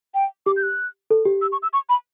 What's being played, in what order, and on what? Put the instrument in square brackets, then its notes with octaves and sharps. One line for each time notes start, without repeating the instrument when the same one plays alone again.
[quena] G5
[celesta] G4 [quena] D6
[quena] G6
F#6
[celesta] A4
G4
[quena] E6
C#6
E6
C#6
B5